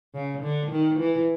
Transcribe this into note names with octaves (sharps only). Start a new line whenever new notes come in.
C#3
D3
D#3
E3